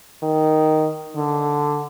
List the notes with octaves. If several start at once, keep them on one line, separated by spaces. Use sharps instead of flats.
D#3
D3